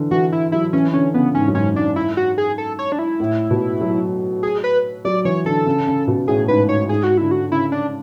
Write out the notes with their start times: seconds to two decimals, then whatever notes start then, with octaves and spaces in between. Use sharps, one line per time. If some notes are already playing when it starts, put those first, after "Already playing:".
Already playing: D3 E3
0.11 E3 F#4
0.32 E4
0.52 F#3 E4
0.73 E3 C#4
0.93 D3 C#4
1.14 C#3 B3
1.35 G#2 C#4
1.47 F#2
1.55 G#2 C#4
1.76 G#2 D4
1.96 E4
2.17 F#4
2.38 G#4
2.58 A4
2.79 C#5
2.92 D4
2.99 E4
3.20 A2
3.51 B2
3.81 F#3
4.43 G#4
4.64 B4
5.05 F#3 D5
5.25 E3 C#5
5.46 D3 A4
5.67 C#3
5.87 C#3
6.08 B2
6.28 A2 G#4
6.48 G#2 B4
6.69 G#2 C#5
6.89 G#2 G#4
7.03 F#4
7.17 D3 E4
7.31 F#4
7.51 C#3 E4
7.72 D4